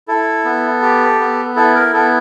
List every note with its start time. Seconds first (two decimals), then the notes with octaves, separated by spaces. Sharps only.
0.08 E4 A4
0.45 B3
0.82 G4
1.19 B3
1.56 E4 A4
1.75 A#4
1.93 B3 A4